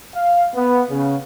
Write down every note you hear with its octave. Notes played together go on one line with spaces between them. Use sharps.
F5
B3
C#3